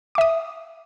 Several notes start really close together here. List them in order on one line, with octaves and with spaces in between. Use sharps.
D6 E5 D#6